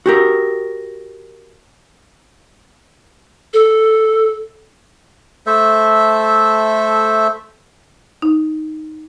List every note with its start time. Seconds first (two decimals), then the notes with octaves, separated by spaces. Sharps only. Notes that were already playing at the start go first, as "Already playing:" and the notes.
0.06 F#4 G4 A#4
3.54 A4
5.47 A3 A4 C5 E5
8.22 D#4